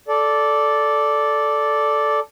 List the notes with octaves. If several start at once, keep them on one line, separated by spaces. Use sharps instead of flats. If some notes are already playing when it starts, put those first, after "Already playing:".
A4 D5